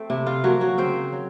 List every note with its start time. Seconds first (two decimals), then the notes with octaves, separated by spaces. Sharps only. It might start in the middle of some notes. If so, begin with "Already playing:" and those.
Already playing: A3 C4
0.10 C3 E4
0.26 F4
0.44 F3 F#3 A#3 F#4
0.61 F#3 F#4
0.78 C#3 C4 C5
1.12 F#3